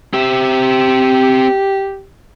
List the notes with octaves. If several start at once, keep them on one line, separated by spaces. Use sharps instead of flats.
C4 G4 E5